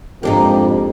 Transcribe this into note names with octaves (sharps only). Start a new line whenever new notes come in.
F2 G#2 A#3 D4 D#4 G4